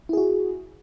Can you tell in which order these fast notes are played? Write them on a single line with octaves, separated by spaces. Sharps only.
E4 G#4 F#4